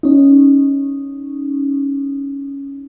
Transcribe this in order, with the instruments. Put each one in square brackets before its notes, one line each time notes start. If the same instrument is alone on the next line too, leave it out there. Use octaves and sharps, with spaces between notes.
[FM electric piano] C#4 D#4